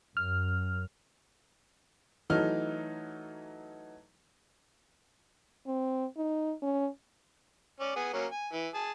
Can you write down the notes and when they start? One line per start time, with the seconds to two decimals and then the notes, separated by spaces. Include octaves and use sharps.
0.17 F#2 F6
2.30 E3 F#3 A3 D#4 F6
5.67 C4
6.17 D#4
6.62 C#4
7.80 C#4 D5
7.96 B3 G#4 G#5
8.14 F#3 A#3 C#4
8.32 G#5
8.53 E3
8.74 G#4 A5